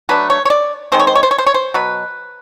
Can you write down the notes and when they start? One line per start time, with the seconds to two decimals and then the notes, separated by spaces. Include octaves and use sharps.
0.09 F#3 A3 D4 B4
0.30 C#5
0.45 C#5
0.50 D5
0.92 D#3 G#3 C4 C5
1.00 C#5
1.07 C5
1.15 C#5
1.23 C5
1.31 C#5
1.38 C5
1.47 C#5
1.54 C5
1.74 B2 F#3 B4